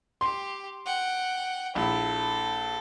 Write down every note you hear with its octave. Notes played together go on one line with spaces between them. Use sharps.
G4 C6
F#5 G5
A#1 E4 A4